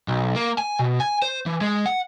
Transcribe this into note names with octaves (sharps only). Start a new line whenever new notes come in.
B1
A#3
G#5
B2
G#5
C5
E3
G#3
F#5